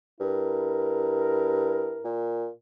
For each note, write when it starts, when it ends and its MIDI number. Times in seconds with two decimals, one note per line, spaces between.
0.20 1.98 43
0.20 2.24 64
0.20 2.24 70
2.04 2.48 46